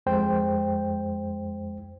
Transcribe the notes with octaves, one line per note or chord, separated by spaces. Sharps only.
F2 G#3 C5 G5